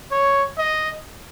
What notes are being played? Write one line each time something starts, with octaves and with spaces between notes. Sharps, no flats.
C#5
D#5